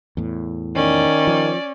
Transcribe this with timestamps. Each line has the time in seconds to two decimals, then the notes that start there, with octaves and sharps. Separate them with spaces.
0.17 E2 A2
0.76 D#3 C#4 D5
1.27 F3